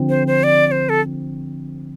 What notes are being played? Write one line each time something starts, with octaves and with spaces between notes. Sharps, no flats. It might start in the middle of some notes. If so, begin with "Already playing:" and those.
Already playing: D3 F3 C4
C5
C5
D5
D5
C5
A4